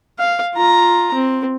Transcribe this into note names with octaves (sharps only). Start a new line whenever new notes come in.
F5
F4 A#5
C4